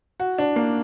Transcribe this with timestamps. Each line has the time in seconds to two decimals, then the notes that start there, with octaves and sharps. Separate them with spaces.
0.20 F#4
0.38 D4
0.56 A#3